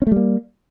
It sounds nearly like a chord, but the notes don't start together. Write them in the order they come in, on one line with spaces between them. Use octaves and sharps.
C#4 A3 G3 A#3